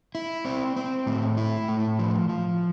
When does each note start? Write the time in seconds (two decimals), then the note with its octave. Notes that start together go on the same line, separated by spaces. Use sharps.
0.15 E4
0.45 C4
0.76 C4
1.07 A2
1.37 E4
1.68 A2
1.99 F3
2.29 F3